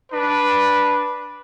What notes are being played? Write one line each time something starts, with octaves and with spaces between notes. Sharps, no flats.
D4 B4